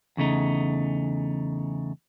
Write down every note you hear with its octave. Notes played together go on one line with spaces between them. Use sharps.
E2 C#3 A3 D#4